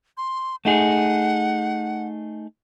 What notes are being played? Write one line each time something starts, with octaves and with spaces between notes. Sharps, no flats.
C6
A3 D#4 G#4 F#5